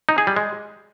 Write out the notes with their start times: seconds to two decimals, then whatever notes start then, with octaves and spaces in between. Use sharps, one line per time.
0.09 D#4
0.18 G#4
0.27 G3
0.36 G#3